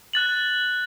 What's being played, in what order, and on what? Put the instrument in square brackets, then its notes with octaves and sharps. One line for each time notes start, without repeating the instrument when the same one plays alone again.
[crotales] F#6 A6 F#7